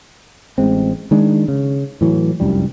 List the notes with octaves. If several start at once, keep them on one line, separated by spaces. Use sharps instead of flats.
A1 G#3 C4
D#3 G#3 D4
C#3
A2 E3 F#3
F1 C2 F#2 G3